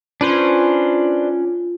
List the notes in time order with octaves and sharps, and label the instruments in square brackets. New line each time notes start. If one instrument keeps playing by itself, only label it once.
[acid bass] C#4 [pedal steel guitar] D4 B4 C5 [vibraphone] F4